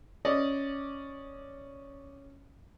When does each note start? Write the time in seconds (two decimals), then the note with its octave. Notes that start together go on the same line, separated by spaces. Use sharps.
0.25 C#4 D5 D#5